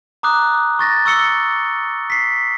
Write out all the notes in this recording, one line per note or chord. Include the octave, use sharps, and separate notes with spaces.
A#5 D6 D#6 F#6
C#6 A6 A#6
C#6 E6 C#7 G7
B6 C7